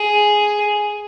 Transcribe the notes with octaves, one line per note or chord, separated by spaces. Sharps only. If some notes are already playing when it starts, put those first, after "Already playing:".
Already playing: G#4